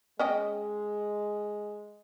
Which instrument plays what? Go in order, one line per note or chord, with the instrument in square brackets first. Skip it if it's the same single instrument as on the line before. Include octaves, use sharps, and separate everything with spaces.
[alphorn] G#3 [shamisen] C#4 D#5 G5